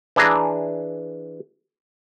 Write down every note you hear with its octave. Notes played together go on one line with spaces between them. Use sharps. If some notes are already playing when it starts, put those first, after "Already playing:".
E3 D4 G#4 A#5